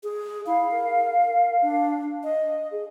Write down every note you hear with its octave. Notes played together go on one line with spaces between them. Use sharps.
G#4
E4 F5
A#4
D4
D#5
G#4